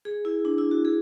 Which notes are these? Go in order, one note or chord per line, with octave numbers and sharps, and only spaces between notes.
G#4
E4
D4
E4
F#4
G#4